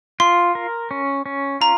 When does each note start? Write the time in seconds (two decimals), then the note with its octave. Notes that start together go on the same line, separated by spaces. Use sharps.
0.20 F4 C6
0.55 A#4
0.91 C#4
1.26 C#4
1.61 F4 A#5